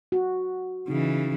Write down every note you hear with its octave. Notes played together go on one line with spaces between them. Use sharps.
F#4
C#3 E3 D#4